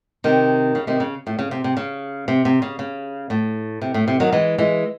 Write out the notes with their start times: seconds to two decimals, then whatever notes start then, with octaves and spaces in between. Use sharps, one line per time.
0.24 C3 D#3
0.75 C#3
0.87 C3 D#3
1.00 C#3
1.27 A2
1.39 C#3
1.51 C3
1.64 C3
1.77 C#3
2.28 C3
2.45 C3
2.62 C#3
2.79 C#3
3.30 A2
3.81 C3
3.94 A2
4.08 C3
4.20 D#3 F#3
4.32 E3 G#3
4.58 E3 G#3